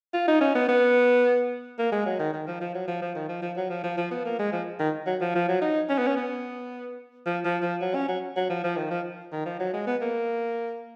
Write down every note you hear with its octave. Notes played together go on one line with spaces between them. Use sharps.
F4
D#4
C#4
B3
B3
A#3
G#3
F#3
D#3
D#3
F3
F3
F#3
F3
F3
D#3
F3
F3
F#3
F3
F3
F3
B3
A#3
G#3
F3
D#3
F#3
F3
F3
F#3
D#4
C#4
B3
C#4
B3
F3
F3
F3
F#3
C#4
F#3
F#3
F3
F3
D#3
F3
D#3
F3
F#3
G#3
B3
A#3